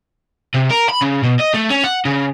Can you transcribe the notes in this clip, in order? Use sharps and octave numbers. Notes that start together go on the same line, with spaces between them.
C3
A#4
B5
C#3
B2
D#5
A3
C#4
F#5
C#3